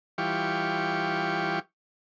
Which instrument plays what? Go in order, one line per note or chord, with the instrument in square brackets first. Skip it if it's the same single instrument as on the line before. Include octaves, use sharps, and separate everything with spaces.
[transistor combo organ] E3 G3 F4 G4 C#6